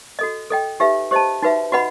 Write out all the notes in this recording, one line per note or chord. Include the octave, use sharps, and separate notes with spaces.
F#4 A4 D#5
A4 D#5 G5
D#4 G4 B4 E5
G4 C5 D#5 A5
D#4 F#4 B4 E5
F#4 B4 D#5 F#5 B5